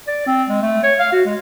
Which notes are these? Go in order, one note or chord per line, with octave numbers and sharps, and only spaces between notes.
D5
C4
G#3
A3
C#5
F5
F#4
G#3